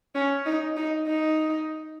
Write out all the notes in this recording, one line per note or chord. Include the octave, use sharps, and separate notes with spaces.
C#4
D#4
D#4
D#4